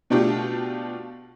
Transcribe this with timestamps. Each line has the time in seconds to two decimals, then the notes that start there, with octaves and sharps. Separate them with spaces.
0.10 B2 A3 D4 F4 G4